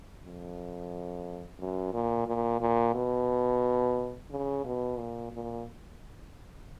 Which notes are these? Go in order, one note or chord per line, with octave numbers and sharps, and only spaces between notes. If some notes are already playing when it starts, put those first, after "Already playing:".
F2
F#2
A#2
A#2
A#2
B2
C#3
B2
A#2
A#2